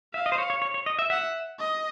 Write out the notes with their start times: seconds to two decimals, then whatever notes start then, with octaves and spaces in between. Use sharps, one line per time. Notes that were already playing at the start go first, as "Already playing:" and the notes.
0.14 E5 F5
0.26 D#5
0.32 C5
0.38 C#5
0.50 C#5
0.62 C#5
0.74 C#5
0.86 D#5
0.99 E5
1.10 E5 F#5
1.59 D#5